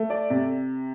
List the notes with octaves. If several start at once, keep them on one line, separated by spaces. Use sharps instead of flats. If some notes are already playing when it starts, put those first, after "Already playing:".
Already playing: A3
D5
C3